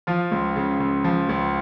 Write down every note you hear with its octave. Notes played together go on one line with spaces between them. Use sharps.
F3 F4
C#2
C#3
C#2
F3
C#2